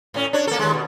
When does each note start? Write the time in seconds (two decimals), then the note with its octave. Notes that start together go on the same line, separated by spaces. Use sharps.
0.14 A2 C#4
0.33 D4 C#5
0.47 A#3 A4
0.59 D#2 G#3
0.73 B2